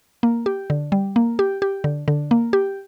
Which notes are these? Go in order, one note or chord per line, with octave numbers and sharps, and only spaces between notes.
A#3
G4
D3
G3
A#3
G4
G4
D3
D3
A#3
G4